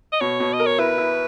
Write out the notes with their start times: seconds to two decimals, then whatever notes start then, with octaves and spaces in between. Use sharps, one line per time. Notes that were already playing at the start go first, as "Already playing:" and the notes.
0.12 D#5
0.20 B2 C#5
0.40 B2
0.53 D#5
0.60 A#4
0.66 C#5
0.78 E4 B4
0.98 E4